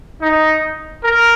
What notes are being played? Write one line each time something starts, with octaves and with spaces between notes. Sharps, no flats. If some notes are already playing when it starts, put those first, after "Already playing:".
D#4
A#4